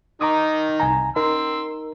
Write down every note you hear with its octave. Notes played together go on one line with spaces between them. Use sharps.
D#3 D#4 A#5 D6 D#6
C2 G#5 A#5
D#4 A#4 C6 E6